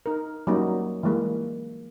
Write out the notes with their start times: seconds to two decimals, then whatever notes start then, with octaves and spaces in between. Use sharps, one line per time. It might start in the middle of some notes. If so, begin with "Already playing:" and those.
0.06 D#4 A#4
0.47 F#3 G3 A#3 C#4 D#4
1.03 E3 G3 G#3 A#3